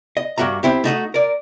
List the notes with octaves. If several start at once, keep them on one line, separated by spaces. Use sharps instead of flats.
D#5
G2 A#3 F#4 E5 A#5
C4 E4 G4
A3 D#4 F#4 D#5
A#4 D5